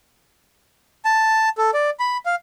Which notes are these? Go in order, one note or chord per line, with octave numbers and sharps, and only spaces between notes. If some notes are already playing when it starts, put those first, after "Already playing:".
A5
A4
D5
B5
F5